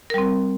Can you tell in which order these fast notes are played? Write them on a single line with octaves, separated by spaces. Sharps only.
A#4 G3 C4